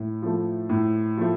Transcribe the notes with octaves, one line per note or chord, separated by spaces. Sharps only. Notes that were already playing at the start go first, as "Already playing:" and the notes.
Already playing: A2
F3 A3
A2
F3 A3